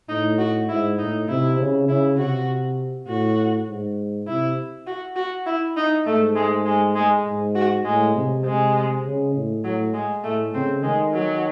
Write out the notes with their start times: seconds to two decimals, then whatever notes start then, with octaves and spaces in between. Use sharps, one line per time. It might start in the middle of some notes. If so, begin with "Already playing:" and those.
0.09 A2 D#4
0.38 F#4
0.69 G#2 E4
0.98 A2 D#4
1.28 C3 E4
1.59 C#3
1.88 C#3 E4
2.18 C3 F#4
3.08 A2 F#4
3.67 G#2
4.27 C3 E4
4.87 F#4
5.16 F#4
5.46 E4
5.77 D#4
6.06 G#2 A3
6.35 G#3
6.66 G#3
6.95 G#3
7.25 G#2
7.55 F#4
7.85 A2 G#3
8.15 C3
8.45 C3 G#3
9.04 C#3
9.35 A2
9.64 A2 F#3
9.94 G#3
10.24 A2 A3
10.54 C#3 C4
10.83 D#3 G#3
11.13 F#3